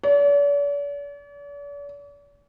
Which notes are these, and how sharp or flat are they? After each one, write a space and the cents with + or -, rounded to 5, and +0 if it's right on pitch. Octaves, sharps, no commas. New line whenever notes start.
D5 -45